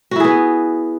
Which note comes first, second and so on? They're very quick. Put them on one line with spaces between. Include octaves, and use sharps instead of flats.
F#4 E4 G#4 B3